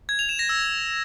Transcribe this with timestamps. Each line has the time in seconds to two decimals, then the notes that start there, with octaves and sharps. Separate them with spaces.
0.09 G#6
0.19 F7
0.29 E7
0.39 A#6
0.49 E6